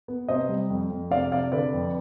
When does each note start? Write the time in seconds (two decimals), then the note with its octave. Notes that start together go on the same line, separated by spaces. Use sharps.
0.08 B3
0.28 C3 C5 D#5
0.49 G3
0.70 F2
0.90 F2
1.11 C3 D5 F5
1.32 C3 D5 F5
1.52 D3 B4 D5
1.74 F2